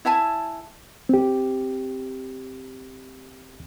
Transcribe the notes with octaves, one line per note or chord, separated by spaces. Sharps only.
E4 E5 G#5 A5
C4 G4